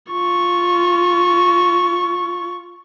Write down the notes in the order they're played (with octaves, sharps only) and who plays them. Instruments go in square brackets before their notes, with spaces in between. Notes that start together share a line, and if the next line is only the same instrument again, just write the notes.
[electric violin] F4 C#6